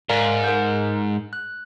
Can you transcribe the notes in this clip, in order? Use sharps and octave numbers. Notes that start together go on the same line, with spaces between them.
G#2 A#4 D5 F5
A#4 G6
F#6